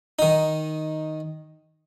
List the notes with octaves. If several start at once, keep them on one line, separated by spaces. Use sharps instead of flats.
D#3 D#4